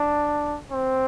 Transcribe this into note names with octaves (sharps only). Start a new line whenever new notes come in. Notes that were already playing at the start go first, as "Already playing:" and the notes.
Already playing: D4
C4